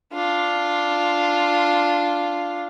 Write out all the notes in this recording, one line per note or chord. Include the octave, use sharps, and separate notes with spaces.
D4 F4